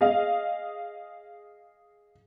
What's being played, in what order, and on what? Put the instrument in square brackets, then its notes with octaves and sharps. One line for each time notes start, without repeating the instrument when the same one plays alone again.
[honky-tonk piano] G#4 D#5 F5